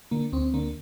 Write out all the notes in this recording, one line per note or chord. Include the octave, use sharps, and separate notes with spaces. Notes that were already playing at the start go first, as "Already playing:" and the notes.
D3 A#3
D2 C4
D3 A#3